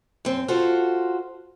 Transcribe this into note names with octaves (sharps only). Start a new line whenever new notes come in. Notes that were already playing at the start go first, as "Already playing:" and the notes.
F#2 C4
F4 F#4 A4 C5